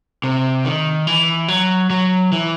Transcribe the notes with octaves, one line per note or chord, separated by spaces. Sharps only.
C3
D#3
E3
F#3
F#3
E3